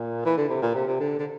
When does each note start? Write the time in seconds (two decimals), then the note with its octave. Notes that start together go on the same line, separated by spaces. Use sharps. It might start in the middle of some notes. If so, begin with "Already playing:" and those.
Already playing: A#2
0.25 E3
0.37 D3
0.49 C3
0.62 A#2
0.74 C3
0.87 C3
1.00 D3
1.19 D3